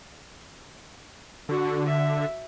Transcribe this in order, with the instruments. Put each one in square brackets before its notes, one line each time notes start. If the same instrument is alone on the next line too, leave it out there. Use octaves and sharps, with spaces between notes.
[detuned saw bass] D3 [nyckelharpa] F#4
[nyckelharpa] E5